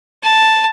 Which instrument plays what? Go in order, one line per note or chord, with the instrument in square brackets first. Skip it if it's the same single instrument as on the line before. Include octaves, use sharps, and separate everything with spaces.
[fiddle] A5